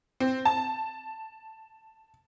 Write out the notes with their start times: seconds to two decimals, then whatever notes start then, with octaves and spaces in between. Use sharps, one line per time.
0.20 C4
0.45 A5